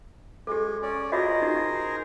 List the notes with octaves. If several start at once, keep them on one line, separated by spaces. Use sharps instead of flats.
G#3 G4 A4
C#4 D5
F4 F#4 G#4 A#4 C5 D#5
D#4 G4